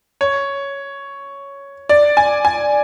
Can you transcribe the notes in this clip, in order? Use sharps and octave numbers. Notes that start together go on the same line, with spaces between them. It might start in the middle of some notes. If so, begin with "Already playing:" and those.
C#5
D5
G#5
G#5